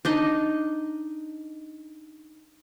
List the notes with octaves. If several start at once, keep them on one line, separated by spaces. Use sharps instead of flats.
D4 D#4 D#5